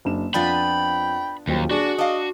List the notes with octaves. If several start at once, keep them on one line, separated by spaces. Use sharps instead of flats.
F#1 D4 E7
F2 B3 D4 F4 G5 B5
D#1 D#2 F3 F#3 G5
D4 F#4 G#4
D4 D#5 F5